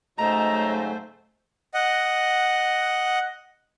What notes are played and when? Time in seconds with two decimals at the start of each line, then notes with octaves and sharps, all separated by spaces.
0.19 G#2 C#3 F#3 A3 C5 D#5 A#5
1.74 D#5 F#5